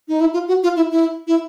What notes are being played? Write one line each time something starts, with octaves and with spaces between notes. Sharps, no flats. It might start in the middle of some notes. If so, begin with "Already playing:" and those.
D#4
E4
F4
F#4
F4
E4
E4
E4